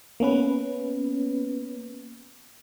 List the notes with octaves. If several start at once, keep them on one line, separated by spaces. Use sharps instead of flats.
A#3 B3 C#4 B4